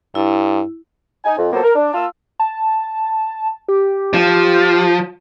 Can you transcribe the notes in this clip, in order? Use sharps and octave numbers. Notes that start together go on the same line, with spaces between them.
G2 E4
D#4 G#5
F2
F3 F#3 A#3 B3 A4 C5
A#4
D4
A#3 F4 A5 E6
A5
G4
F3